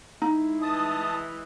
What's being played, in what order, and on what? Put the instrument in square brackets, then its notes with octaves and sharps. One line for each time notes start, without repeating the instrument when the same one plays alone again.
[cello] G#3 E4 [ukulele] D#4
[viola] E3 D#5 [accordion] A5 D#6